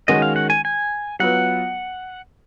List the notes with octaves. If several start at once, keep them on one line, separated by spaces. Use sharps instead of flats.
D#3 G#3 C#4 F#4 A#4 D#5
F5
F#5
G#5
G#5
F#3 B3 F4 B4 F#5